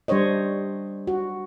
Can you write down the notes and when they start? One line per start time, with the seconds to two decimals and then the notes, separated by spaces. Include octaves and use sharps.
0.08 G3 D4 C5 C#5 D#5
1.07 F#4